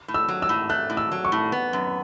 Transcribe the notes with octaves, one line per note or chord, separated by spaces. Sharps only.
A2
E6
F#3
E6
A2
A3 F#6
A2
E6
F#3
C#6
A2
B3
F#2